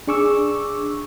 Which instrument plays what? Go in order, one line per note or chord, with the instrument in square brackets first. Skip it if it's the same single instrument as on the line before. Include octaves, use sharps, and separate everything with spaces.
[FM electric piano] D4 G#4 C#6 D6 E6